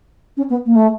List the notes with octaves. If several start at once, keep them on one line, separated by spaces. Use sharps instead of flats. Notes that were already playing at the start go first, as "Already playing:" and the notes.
C#4
B3
A#3
A3